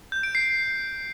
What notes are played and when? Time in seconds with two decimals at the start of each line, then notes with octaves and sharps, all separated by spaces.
0.12 G6
0.23 D7
0.35 C7